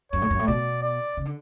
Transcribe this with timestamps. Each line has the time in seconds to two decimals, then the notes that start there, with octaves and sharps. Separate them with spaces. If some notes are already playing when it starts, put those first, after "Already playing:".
0.12 F#2 C#5
0.22 A2
0.30 F#2
0.39 A2
0.47 B2 D5
0.83 D5
1.17 C#3
1.25 D3